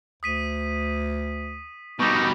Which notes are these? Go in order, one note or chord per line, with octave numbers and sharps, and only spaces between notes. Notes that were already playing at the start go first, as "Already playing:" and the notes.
D2 D#6 B6 D#7
B2 G3 D#4 C#6 D6